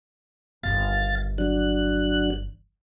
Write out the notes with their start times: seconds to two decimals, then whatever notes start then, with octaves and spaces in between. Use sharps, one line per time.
0.63 G1 D#3 F5 A6
1.38 F#3 D4 F#6